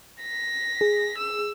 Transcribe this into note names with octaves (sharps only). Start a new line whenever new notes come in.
A#6 B6
G#4
E6